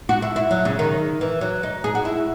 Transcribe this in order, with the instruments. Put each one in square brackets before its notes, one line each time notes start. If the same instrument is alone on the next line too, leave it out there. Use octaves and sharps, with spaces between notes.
[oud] F#4
E4
E4
F#3
C#3
D#3
E3
F#3
D#4
G#4
F#4
E4